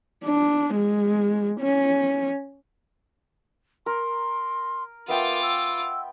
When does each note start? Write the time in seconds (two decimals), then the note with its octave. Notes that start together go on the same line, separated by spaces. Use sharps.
0.25 D4
0.75 G#3
1.60 C#4
3.86 A#4 C6
5.08 B3 F4 A#4 E5 G5 D6
5.42 E6